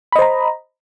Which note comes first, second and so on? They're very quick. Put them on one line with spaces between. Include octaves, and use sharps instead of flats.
B5 D#5 C5 A#5